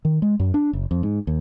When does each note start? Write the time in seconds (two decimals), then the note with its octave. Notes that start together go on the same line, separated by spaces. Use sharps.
0.05 D#3
0.22 G#3
0.40 F#2
0.54 D4
0.73 F#1
0.91 F2
1.03 G#2
1.27 D#2